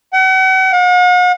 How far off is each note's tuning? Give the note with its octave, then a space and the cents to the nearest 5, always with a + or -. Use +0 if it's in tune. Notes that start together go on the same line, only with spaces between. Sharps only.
F#5 +40
F#5 -45